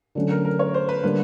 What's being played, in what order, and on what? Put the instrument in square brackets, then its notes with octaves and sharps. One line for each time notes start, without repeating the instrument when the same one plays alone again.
[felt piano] D3 F#3 A3 C#4
[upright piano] A#4
A#4
C#5
C5
B4
[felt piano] D3 G3 A#3 D4 [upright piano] B4